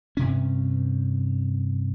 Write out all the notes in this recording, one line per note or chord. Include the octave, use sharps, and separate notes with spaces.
G2 C3 C#4